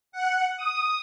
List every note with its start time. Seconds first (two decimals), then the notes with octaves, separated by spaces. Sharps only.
0.12 F#5
0.56 D#6